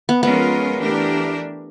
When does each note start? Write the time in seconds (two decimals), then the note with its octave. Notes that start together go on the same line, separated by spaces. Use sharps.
0.09 B3
0.23 F3 G#3 B3 C#4 F4 A#4
0.80 E3 A3 D4 G4 A#4